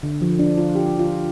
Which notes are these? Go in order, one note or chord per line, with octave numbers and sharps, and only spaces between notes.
D3
F3
D4
F4
G4
F4